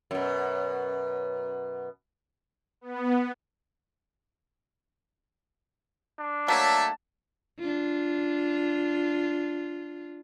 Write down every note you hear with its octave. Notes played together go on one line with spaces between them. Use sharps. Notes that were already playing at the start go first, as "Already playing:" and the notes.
F#2 B2
B3
D4
F#3 A3 A#3 C#5 E5 A5
D4 F4